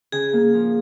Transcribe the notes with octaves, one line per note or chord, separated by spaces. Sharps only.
C#3 G#4
A#3
F3